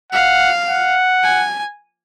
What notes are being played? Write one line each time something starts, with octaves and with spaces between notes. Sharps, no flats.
F5 F#5
F#5
G#5